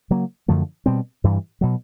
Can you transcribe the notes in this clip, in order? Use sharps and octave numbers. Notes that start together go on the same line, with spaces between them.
C#3 F#3 A#3
F#2 D3 F3 A3
B2 G3 C4
G2 E3 G3
B2 F#3